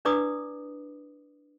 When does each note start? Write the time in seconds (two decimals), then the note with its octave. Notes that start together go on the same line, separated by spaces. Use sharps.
0.05 D4 E4 B4 D5 D6 D#6